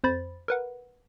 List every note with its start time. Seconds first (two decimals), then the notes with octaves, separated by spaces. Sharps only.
0.04 F2 C5 B5 A6
0.48 A#4 B4 F#5